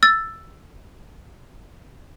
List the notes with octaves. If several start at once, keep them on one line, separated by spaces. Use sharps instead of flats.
E6 A6